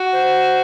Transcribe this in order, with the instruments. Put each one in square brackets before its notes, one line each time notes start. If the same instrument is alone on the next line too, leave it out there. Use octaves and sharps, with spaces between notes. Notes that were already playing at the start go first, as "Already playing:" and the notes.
Already playing: [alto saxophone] F#4
[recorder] C5